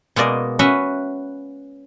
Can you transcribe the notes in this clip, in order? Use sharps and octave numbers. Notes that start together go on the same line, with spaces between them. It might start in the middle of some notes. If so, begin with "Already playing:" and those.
B2 G#3 A#3 D5 D#5
C#4 F#4 B4 E5